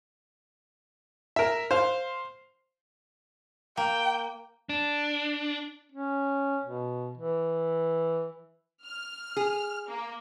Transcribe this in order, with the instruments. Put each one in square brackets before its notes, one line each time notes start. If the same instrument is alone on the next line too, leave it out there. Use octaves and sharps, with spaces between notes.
[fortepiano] A#4 E5
C5 F5
[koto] A#3 [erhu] G5
[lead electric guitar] D4
[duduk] C#4
B2
E3
[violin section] F6
[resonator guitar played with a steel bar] G#4
[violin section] A#3